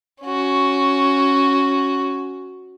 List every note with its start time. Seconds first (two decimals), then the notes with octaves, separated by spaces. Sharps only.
0.23 C#4 F#4